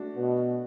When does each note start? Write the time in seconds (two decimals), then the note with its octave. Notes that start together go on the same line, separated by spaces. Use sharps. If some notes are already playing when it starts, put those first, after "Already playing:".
Already playing: A3 D4 F#4
0.16 B2